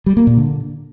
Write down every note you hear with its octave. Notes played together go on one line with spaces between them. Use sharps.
G3
A#3
A#2
D3